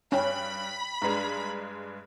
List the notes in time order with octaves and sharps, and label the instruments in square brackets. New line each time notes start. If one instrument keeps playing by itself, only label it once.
[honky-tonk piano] G2 [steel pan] C#4 [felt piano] G5 [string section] B5
[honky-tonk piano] G2 G#3 [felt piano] D4 B4 A#5